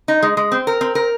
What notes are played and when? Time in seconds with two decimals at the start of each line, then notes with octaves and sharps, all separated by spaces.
0.08 D#4
0.23 G#3
0.37 G#3
0.52 C4
0.67 A#4
0.81 C4
0.95 A#4